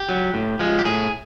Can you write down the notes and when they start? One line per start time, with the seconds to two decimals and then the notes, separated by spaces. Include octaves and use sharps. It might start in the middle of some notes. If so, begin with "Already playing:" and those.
Already playing: G4
0.09 F#3
0.34 A2
0.59 F3 G#3
0.79 G4
0.85 A2 G#4